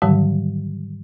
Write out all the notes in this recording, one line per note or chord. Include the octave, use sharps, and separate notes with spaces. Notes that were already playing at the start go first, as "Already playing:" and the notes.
G#2 D3 D#3 F#3 G3